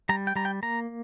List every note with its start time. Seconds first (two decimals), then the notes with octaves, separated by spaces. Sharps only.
0.09 G3 A#5
0.27 G5
0.36 G3 A#5
0.45 G5
0.63 A#3 A#5